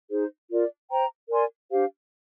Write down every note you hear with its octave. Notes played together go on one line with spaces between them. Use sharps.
D#4 G#4 C5
F4 A#4 D5
C5 G5 A#5
A#4 D5 G#5 C6
D4 G4 C5 F5